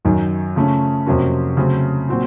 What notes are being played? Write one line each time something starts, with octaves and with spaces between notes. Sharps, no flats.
F#2 D#3 F#3
C#3 F3 A3 C#4
F2 C3 F#3 A#3 C#4
C#3 F#3 A3 C4
A#2 F#3 C4 F#4